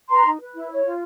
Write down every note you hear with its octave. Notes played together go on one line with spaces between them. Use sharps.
B4 A#5 C6
D#4
B4
E4
C#5
F4